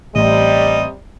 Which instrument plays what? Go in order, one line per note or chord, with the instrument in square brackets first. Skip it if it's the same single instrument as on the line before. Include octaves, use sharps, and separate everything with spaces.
[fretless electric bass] A1 [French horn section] C3 G3 [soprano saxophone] D#5